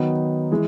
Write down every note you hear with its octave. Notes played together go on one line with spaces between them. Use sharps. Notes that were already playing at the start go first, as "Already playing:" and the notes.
Already playing: D#3 F#3 B3 D#4
E3 G#3